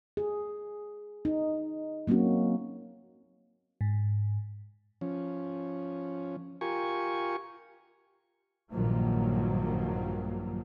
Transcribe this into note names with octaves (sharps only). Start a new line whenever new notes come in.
G#4
D#4
F#3 A#3 C4 C#4 F#4
G#2
F3 C#4
F4 G4 A#4 G#5 C#6
A#1 G2 D#3 F3 F#3 A#3